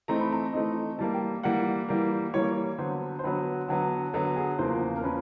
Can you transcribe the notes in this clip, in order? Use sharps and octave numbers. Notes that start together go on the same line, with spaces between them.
E3 A3 C4 D#4 A#5
B5
A#5
E3 A3 C4 D#4
E3 G3 A#3 A5
G5
E3 G3 A#3 F#5
E3 G3 A#3
E3 G3 A#3 C#5
D3 F#3 B3 C5
C5
D3 F#3 B3 B4
D3 F#3 B3
D3 F#3 B3 A4
G#4
E2 C#3 F3 A#3 C#4 C5
A#4
F3 A#3 C#4 B4